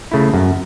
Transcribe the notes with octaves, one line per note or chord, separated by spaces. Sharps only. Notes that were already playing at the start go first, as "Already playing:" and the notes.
C#3 A3 E4
F#2